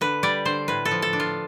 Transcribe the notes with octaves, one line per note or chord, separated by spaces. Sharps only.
D3 B4
G3 D5
D3 C5
A2 B4
A4
F3
A4
D4
F4